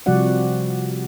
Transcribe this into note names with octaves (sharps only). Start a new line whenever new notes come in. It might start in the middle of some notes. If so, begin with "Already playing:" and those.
C3 F3 G3 F#4 D5 F#5